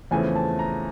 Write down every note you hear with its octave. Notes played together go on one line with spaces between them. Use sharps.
E2 C#3 F3 A3 C4 G#5
A5
A#5